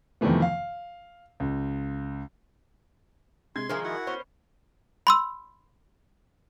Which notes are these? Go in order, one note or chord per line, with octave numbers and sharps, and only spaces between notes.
F2 C3 D#3 E3 A3 B3
F5
C#2
C3 G#3 C6 G#6
D#3 F3 G#3 A#4 E5 G#5
E4 F#4 F#5
B3 C#4 C5
B5 C6 E6